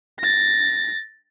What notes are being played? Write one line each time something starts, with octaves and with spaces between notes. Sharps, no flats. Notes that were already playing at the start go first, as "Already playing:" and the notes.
A6 A#6